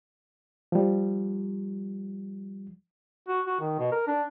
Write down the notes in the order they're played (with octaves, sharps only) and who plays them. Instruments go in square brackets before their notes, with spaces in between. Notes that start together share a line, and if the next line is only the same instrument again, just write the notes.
[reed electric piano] F3 G3
[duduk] F#4
F#4
D#3
B2
A#4
D4